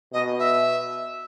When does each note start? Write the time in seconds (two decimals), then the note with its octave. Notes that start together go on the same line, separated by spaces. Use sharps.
0.13 B2 D#5
0.39 E5